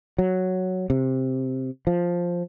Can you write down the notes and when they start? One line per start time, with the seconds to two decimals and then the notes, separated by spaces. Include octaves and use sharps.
0.18 F#3
0.90 C3
1.87 F3